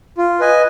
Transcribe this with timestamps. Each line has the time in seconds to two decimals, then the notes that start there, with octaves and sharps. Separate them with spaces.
0.18 F4
0.40 B4 D#5 G#5